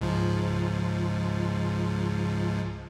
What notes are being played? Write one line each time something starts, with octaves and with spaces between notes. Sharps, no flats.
C#2 G#2 F3